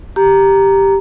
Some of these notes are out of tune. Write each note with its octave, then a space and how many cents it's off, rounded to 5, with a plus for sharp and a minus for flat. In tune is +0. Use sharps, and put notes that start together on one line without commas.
G4 +0 A#5 +0